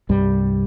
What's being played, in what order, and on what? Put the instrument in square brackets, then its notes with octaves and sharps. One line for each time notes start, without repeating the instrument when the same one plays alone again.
[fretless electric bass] C2 G2 G3